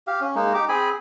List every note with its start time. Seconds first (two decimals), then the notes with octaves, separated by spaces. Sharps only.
0.07 G4 F5
0.21 C#4
0.35 G#3 A#3 D#4
0.54 D#4 G4 D6
0.69 C4 G#4 G#5 B5